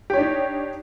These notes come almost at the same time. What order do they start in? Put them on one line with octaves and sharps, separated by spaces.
G4 C#5 D4 D#4